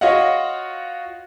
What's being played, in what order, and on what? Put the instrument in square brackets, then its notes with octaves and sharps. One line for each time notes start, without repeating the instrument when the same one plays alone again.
[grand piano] F4 F#4 C#5 D#5 F5 F#5